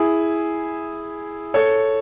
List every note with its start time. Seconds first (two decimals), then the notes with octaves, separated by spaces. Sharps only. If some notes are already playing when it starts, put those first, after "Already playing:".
Already playing: E4 G#4
1.54 A4 C#5